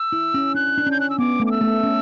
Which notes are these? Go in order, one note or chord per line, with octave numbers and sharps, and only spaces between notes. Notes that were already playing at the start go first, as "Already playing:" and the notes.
Already playing: E6
E4
C#4
D4 F#6
D4
C#4 G6
F#6
E6
B3 D6
A3
D6
E6
A3
C#4